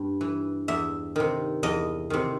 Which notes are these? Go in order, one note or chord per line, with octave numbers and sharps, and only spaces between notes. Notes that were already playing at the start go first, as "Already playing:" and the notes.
Already playing: G2
E3
E2 E5
C3 D#3
E2 D#5
C3 D#3